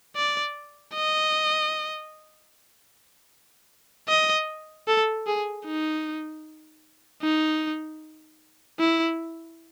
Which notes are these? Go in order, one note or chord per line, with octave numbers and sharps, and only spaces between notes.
D5
D#5
D#5
A4
G#4
D#4
D#4
E4